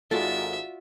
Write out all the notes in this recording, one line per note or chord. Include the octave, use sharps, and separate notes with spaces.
G#1 G#2 F4 F#4 A4 D5 E5